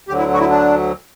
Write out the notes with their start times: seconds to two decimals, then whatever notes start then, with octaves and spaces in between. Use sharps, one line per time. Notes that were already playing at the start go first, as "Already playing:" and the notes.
0.08 D2 D3 F#3 G4
0.19 E4
0.33 F#4
0.41 E4
0.50 D4